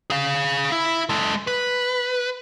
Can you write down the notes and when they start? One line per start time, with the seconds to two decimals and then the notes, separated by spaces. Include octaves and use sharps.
0.10 G#4 F5
0.72 E4
1.09 G#3 A4
1.47 B4